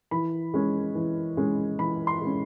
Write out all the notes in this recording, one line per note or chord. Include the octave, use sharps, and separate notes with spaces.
E3 B5
G#3 C#4
E3
G#3 C#4
E3 B5
C6
G#3 C#4